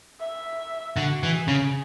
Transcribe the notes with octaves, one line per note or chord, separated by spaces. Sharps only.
E5
D3 F#4
E3
G#4
C#3